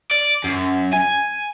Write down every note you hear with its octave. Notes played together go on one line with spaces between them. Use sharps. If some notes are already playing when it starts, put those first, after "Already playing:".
D5
F#2
G#5